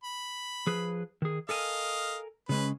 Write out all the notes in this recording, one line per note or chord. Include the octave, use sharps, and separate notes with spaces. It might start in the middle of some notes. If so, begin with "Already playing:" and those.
B5
F3 G#4 B4
D#3 G#4
A4 A#4 D#5 F5 G#5
C#3 G#3 C#4 B4